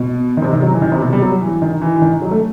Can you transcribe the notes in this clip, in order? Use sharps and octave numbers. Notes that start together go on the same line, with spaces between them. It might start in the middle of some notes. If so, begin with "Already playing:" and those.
Already playing: B2
D#3
C3
D#3
F#3
E3
D#3
C3
B2
G3
F#3
E3
D#3
E3
E3
D#3
F#3
A3